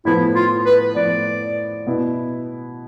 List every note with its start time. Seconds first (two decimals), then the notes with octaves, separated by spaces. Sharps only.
0.05 A2 F3 B3 E4
0.35 F4
0.65 B4
0.96 A2 F3 B3 D5
1.86 B2 B3 E4